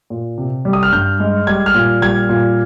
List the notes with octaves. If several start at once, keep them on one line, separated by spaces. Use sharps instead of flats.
A#2
C3
G3
D#6
F6
G2 G6
G#3
G3 G#6
F6
A#2
G3 G#6
A#2